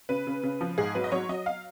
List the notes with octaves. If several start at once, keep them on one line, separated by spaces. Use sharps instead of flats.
C#3 B4
C#3
C#3
F3
G#2 G#4
F#3 B4
D#5
F#3 C#5
F#3 D#5
F5